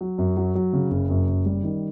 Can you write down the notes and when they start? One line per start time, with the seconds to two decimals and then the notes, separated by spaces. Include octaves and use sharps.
0.01 F#3
0.18 F#2
0.37 F#3
0.55 F#3
0.73 C#3
0.91 F#1
1.10 F#2
1.28 F#1
1.46 G3
1.64 D#3